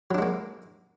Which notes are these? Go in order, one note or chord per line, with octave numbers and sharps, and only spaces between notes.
F#3 G#3 A#3 D4